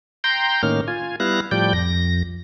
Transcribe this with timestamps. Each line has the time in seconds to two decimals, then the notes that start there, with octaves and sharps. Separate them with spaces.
0.24 G5 A#5 C6 G6
0.63 A2 D#3 A#3 C#4 F6
0.88 F4 G#5
1.20 G3 B3 E4 F5 F#6 A#6
1.51 A2 F3 G3 D5 G5 G6
1.73 F2 A#6